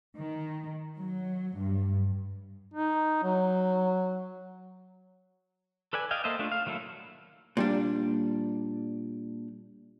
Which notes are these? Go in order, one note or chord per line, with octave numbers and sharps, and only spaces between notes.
D#3
F#3
G2
D#4
F#3
A4 B4 D5 G#5
D5 D#5 F5 G5 G#5
A#3 A4 C5 D#5 E5
A3 D4 F4
F5
D#3 F#3 A#3 E4 A4
A#2 G3 D4